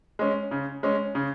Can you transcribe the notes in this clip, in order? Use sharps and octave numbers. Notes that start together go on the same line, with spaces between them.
G#3 C#4
C#3
G#3 C#4
C#3